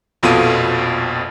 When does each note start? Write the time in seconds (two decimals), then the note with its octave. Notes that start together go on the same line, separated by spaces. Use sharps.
0.23 A#1 F2 B2 F4 A4 D#7